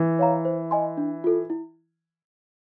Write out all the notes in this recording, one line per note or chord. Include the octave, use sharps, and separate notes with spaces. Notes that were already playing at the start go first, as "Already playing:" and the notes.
Already playing: E3
C#5 F5 A#5
C5
D#5 G#5 C6
D4
F4 A4
E4